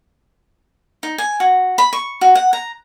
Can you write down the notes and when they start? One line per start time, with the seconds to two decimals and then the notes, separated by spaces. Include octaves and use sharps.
1.03 D#4
1.18 G#5
1.40 F#4
1.78 B5
1.93 C#6
2.21 F#4
2.35 F#5
2.53 A#5